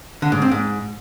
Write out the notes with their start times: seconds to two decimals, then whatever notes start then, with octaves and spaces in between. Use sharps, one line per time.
0.22 D3
0.32 G#2
0.42 C4
0.51 G#2